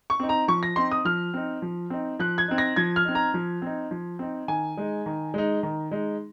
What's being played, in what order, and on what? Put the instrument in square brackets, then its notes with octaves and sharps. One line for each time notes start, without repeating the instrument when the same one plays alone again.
[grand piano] C#6
C4 D#4
A#5
F3 C#6
A#6
C4 D#4 C6
D#6
F3 F6
C4 D#4
F3
C4 D#4
F3 F#6
G#6
C4 D#4
A#6
F3 G#6
F6
C4 D#4
A#5
F3
C4 D#4
F3
C4 D#4
D#3 G#5
G#3 D#4
D#3
G#3 D#4
D#3
G#3 D#4